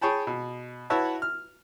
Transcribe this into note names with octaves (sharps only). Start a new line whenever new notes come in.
G#4 C#5 G5 A5 B5
B2
E4 F#4 B4 C#5 E5 A5
F6